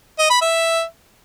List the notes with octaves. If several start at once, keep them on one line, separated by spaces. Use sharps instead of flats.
D#5
B5
E5